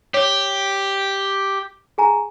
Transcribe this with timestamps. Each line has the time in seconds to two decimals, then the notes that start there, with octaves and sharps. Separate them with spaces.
0.14 G4 C#5
1.98 G#4 G#5 A#5